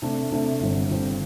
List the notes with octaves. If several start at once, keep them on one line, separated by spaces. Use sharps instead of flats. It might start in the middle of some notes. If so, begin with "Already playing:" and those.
C3 A3 D4
C3 A3 D4
G1 G2 D3 C4
G1 G2 D3 C4